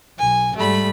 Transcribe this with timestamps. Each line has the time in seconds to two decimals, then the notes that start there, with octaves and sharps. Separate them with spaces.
0.19 B1 G#5
0.56 G#2 G3 A3 B5